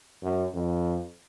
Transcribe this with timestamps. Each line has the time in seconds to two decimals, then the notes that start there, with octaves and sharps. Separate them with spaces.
0.23 F#2
0.54 F2